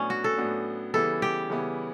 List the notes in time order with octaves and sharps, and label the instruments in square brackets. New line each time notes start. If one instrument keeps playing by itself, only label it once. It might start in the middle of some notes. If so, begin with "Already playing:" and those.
Already playing: [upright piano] A2 F#3 B3 D4 [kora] C#4
[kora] F#4
A4
[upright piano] A2 F#3 B3 D4
[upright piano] C#3 E3 G3 B3 E4 [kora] A4
[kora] G4
[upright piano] C#3 E3 G3 B3 E4